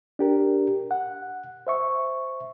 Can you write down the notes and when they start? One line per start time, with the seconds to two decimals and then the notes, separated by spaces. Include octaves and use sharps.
0.19 D4 G4 A#4
0.91 F#5
1.67 C5 E5 C#6